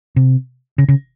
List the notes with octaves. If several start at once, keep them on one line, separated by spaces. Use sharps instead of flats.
C3
C#3
C#3